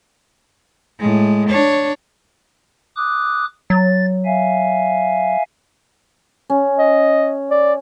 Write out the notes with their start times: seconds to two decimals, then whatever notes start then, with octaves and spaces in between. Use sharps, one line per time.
0.99 A2 G#3
1.49 D4 C#5
2.96 D6 D#6 F#6
3.70 F#3 A6
4.25 E5 F5 G#5
6.50 C#4
6.79 D#5
7.51 D5